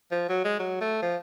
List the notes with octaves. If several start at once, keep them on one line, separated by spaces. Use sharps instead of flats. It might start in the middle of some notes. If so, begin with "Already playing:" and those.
F3
F#3
G#3
F#3
A3
F3